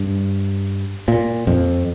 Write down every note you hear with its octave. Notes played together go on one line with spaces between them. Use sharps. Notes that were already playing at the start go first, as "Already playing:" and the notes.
Already playing: G2
A#2
F2